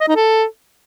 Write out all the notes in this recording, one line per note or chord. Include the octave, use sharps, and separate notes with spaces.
D#5
D#4
A4